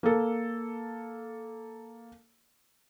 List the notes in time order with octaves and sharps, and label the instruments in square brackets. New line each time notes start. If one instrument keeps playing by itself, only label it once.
[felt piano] A#3 A4